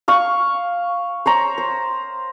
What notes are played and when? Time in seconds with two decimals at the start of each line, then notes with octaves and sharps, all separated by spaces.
0.08 F5 C#6
1.26 C5 C#5 A#5
1.58 C5